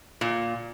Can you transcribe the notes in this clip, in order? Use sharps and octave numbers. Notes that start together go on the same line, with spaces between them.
A#2